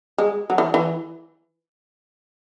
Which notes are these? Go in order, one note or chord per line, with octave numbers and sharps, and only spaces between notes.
G#3
F#3
E3
E3